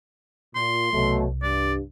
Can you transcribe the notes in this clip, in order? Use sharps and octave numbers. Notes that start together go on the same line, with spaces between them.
A#2 C6
C2 B2 F#3 A3
G2 D5